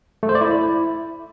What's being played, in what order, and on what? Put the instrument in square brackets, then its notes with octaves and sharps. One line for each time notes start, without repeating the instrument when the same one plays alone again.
[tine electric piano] A3
C5
D5
E4